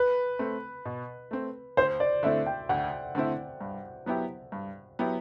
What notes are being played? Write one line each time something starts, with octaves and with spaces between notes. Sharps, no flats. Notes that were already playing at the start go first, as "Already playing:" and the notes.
Already playing: B4
A3 C4
B2
A3 C4
D2 C5
D5
D3 A3 C4 E4 E5
G5
D2 F#5
D3 A3 C4 E4
G2
F#3 B3 E4 G4
G2
F#3 B3 E4 G4